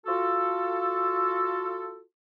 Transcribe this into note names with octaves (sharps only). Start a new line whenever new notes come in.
F4 F#4 A4